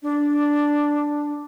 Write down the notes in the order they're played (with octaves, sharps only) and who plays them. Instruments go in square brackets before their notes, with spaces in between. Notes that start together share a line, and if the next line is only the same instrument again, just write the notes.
[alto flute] D4